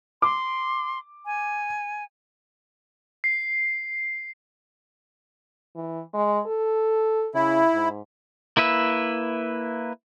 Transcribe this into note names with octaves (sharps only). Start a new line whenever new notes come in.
C6 D6
G#5
C7
E3
G#3
A4
C#3 E4
G#2
A#3 E4 B4 E5